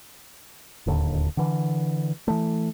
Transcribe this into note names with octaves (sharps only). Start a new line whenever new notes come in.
D1 D#2 D3
D3 E3
E3 A3